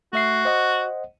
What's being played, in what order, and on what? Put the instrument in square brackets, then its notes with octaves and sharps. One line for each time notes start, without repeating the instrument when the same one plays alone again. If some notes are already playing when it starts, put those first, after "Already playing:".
[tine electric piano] A3 E5 C7 [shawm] F#4
[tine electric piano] C5 D#5 F#5